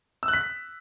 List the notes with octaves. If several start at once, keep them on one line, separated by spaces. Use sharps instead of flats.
E6
F#6
B6